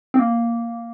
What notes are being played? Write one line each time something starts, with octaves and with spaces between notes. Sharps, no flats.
C4
A#3